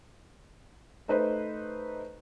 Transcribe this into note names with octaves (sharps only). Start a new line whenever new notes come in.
A3 D#4 B4 C5